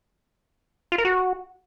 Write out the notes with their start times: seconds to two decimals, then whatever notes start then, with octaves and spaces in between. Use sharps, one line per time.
0.92 F4
0.98 A#4
1.05 F#4